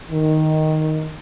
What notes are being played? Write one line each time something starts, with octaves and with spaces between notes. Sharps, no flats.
D#3